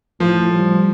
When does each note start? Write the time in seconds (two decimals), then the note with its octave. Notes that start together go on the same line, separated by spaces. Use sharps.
0.20 A2 F3
0.53 G3